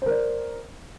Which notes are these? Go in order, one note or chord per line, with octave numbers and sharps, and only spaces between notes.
A#4 C5 D5